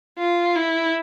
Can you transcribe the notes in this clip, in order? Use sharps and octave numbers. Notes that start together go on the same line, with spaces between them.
F4
E4